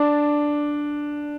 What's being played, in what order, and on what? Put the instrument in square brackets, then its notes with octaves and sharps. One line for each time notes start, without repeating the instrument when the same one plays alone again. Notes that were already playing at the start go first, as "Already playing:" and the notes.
Already playing: [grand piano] D4